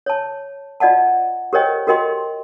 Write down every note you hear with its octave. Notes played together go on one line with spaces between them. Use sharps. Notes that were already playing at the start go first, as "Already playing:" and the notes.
C#5 A5
F4 D5 D#5 F#5 A5
G4 A#4 C5 C#5 D#5 G5
F#4 G4 A#4 D#5 G5 C6